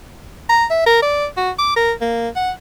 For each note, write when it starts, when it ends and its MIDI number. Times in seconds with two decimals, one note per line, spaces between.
0.49 0.65 82
0.70 0.84 76
0.86 0.98 70
1.02 1.26 74
1.37 1.51 66
1.59 1.76 86
1.76 1.92 70
2.01 2.28 58
2.36 2.51 78